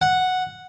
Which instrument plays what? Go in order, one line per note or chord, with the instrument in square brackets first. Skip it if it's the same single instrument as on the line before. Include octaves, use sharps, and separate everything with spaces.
[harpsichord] F#5